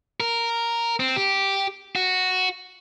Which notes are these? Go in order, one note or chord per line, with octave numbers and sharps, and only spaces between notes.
A#4
C4
G4
F#4